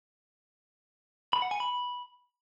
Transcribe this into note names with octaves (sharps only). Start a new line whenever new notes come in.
B5
F#5
G#5
B5